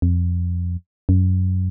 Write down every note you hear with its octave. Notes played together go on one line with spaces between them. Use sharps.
F2
F#2